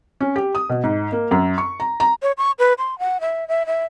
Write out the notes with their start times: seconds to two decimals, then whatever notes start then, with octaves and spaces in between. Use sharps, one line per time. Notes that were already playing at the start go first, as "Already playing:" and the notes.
0.21 C#4
0.36 G4
0.55 D#6
0.70 B2
0.84 G#2
1.12 A#3
1.31 F#2
1.58 C#6
1.80 A#5
2.00 A#5
2.22 C#5
2.37 C#6
2.59 B4
2.78 C6
2.99 F#5
3.21 E5
3.48 E5
3.66 E5